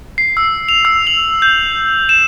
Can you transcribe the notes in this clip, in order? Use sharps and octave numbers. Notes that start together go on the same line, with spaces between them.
C7
E6
F7
E6
F#7
G6
E7